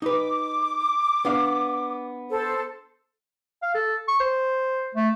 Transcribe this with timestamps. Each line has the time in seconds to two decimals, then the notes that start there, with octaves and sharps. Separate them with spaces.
0.02 D#4 B4 D6
1.25 B3 D4 F5
2.30 A4 C5
3.62 F5
3.75 A4
4.08 C#6
4.20 C5
4.95 A3